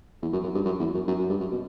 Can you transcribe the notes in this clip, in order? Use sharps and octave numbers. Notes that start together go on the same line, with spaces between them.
E2
F#2
F#2
G2
F#2
E2
F#2
F#2
F#2
G2
F#2
B2